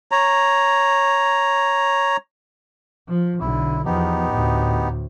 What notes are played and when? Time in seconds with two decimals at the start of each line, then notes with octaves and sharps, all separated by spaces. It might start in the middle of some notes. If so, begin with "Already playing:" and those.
0.11 C#5 A#5
3.08 F3
3.40 B1 D3 E4
3.85 E2 F3 B3 D#4 G4
4.30 D2 A2